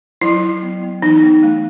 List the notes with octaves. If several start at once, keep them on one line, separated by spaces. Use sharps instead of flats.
F#3 E4
F#3
B3
B3
E3 D#4
B3
A3